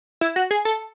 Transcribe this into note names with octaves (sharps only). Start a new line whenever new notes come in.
E4
F#4
G#4
A4